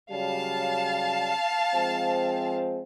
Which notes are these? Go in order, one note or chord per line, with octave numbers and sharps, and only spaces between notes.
C#3 F#3 G3 F5 A5
F3 G#3 C4